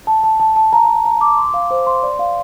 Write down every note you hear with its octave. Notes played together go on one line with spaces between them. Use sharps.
A5
A5
A5
A5
A#5
A#5
A#5
D6
C6
F5
C5
C6
D5
F5